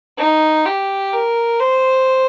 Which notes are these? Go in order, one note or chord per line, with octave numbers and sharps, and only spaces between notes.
D#4
G4
A#4
C5